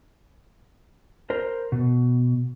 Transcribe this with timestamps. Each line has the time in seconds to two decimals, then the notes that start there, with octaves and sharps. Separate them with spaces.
1.30 A#4 C5
1.72 B2